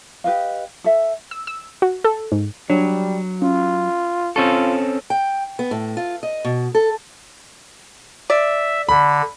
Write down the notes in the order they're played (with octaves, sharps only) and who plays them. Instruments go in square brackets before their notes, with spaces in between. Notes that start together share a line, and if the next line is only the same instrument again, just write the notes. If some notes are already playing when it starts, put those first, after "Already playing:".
[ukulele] G4 B4 D#5 F5
A4 E5
[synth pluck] E6
E6
F#4
A4
G#2
[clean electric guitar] F#3 [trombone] G3 [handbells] D4 C#5
[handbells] C#4 [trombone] F4
[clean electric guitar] C4 C#4 A4 [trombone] F4 [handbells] C#6
[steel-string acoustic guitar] G5
B3
A2
F4
D#5
B2
A4
[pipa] D5 [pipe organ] E5
[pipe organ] D3 [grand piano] B5